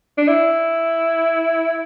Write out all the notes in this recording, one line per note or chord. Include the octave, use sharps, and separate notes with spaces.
D4
E4